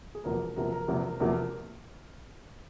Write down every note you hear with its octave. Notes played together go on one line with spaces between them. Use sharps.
G#4
E1 E2 C3 F3 A#3 A#4
E1 E2 C3 F3 A#3 A#4
A#4
E1 E2 C3 F3 A#3
E1 E2 C3 F3 A#3